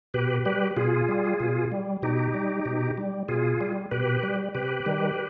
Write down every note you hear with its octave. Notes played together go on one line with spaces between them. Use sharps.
B2 G4 B4
G3 G4 B4
B2 F4 G#4
G3
B2
G3
B2 D#4 G4
G3
B2
G3
B2 F4 G#4
G3
B2 G4 B4
G3
C3 G4 B4
D#3 G3